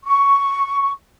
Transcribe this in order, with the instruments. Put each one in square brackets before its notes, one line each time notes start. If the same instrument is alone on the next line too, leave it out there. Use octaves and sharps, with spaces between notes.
[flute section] C#6